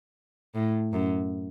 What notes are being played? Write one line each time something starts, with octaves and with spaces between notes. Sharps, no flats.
A2
F#2